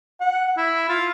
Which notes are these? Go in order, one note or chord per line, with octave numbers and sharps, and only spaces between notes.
F#5
E4
F4